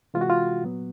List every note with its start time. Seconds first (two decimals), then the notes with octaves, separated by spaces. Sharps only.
0.14 C3 E3 G#3 F4
0.21 F#4
0.30 F4
0.63 A#2 F#3 B3